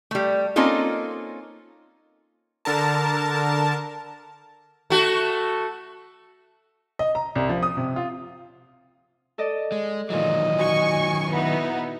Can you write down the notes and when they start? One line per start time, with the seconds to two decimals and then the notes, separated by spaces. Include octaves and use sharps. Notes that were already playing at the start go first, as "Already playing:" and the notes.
0.11 G3 A3
0.56 A#3 C4 C#4 D#4 F4 A4
2.65 D3 A#4 A5
4.90 A3 F#4
6.99 D#5
7.15 A#5
7.35 C2
7.49 F3
7.63 D#6
7.77 C3
7.96 F4
9.38 A4 D5 D#5
9.72 G#3
10.10 A#2 D#3 E3 F#3 D#5
10.59 F#4 G#5 C#6
11.31 B3 D#4 E4